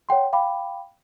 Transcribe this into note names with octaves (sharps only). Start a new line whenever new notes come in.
C#5 F#5 G5 C6
F5 G5 B5 D6